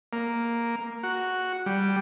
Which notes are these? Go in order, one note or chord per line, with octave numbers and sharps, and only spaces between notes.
A#3
F#4
G3